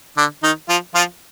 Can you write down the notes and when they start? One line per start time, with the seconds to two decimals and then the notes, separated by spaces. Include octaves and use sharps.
0.17 D3 D4
0.43 D#3 D#4
0.69 F3 F4
0.95 F3 F4